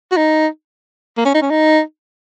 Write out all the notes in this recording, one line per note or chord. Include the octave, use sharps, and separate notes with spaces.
F#4
D#4
A#3
C#4
D#4
C#4
D#4